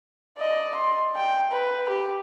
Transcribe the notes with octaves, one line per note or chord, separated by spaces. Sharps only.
D5 D#5
C6
G5
B4
G4